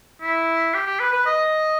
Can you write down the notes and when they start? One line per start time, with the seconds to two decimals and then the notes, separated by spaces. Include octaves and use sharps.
0.22 E4
0.74 G4
0.87 G4
1.00 B4
1.13 B4
1.26 D#5